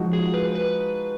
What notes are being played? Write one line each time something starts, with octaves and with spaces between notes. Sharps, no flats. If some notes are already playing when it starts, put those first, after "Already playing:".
Already playing: F3 G#3 D#4 F#4
G#4
B4
B4